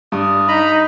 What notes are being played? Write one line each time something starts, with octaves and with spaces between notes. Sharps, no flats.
G2 D5 D#6
D#4 D#5 A#5 B5